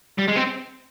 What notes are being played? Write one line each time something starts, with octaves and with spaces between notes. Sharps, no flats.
G3
G#3
C4